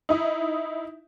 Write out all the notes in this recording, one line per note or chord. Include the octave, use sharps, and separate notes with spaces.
D#4 E4 D#6